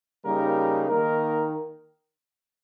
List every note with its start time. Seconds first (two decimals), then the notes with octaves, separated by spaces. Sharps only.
0.25 C#3 G3 A#3 D#4 A#4
0.88 D#3 A#3 D#4 A#4